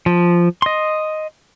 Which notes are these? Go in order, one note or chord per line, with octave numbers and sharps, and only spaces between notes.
F3
D#5 C6